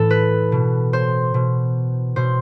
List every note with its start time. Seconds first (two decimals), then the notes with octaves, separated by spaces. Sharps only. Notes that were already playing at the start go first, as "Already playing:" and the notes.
Already playing: A2 E3 A4
0.10 B4
0.52 B2
0.93 C5
1.34 B2
2.16 B2 C5